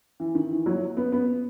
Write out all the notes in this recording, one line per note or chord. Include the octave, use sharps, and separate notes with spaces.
E3
D#3
E3
F#3
B3
B3